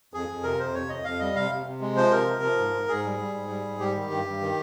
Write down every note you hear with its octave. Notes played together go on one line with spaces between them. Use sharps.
F2 G#4
F2
C3 A#4
F2 C5
C3 C#5
F2 D#5
F2 F5
G3 D#5
C3 F5
C3
C3
G#3
F3 C5
C3 A#4
F3
F3
G#2
G#2
G#2 G#4
G3
G3
G#2
G3
G#2
G3 G4
D#3
G2
G2
D#3